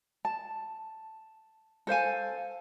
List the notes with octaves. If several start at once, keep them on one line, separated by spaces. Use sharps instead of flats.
A5
A4 C5 F5 G#5